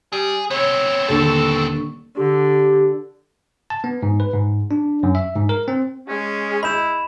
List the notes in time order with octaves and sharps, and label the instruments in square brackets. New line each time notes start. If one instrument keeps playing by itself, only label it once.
[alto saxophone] G3 [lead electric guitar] G#4
[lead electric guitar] B3 C4 [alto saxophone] C#5
[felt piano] D#1 D3 C#6 [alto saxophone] A4
[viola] D3 [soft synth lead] G4
[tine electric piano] A5
B3
G#2
B4
G#2
D4
F#2
E5
G#2
A#4
C4
[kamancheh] G#3 [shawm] C#4
[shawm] E4 [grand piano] D#5 G6 [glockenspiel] B5 E7